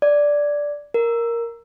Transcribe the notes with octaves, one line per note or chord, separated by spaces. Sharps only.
D5
A#4